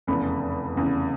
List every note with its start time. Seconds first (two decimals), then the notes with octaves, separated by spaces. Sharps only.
0.07 F1 E2 C#3 B5
0.75 F1 E2 C#3